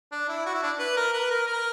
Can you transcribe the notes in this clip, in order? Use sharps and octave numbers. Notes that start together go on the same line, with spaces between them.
D4
E4
F#4
E4
D4
B4
A#4
B4
A#4
A#4